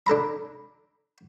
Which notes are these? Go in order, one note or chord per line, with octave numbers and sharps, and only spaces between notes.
D4 A4 A#5 B5